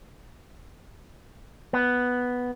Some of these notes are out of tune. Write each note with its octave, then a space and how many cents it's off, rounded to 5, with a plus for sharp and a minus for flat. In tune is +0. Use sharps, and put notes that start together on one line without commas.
B3 +0